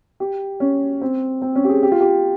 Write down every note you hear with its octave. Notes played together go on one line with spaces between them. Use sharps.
G4
C#4
C4
C4
C#4
G4
G#4
G4
F4
G4